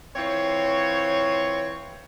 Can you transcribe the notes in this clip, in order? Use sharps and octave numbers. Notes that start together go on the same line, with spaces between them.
E3 C4 F4 C#5